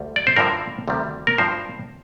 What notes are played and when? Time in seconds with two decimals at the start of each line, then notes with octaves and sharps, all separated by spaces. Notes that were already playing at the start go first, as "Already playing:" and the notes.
Already playing: D2 G3
0.16 D5
0.27 C5
0.36 G2 D3 F3 A#4
0.88 D2 C3 D#3 G3
1.27 A#4
1.38 G2 F3 C5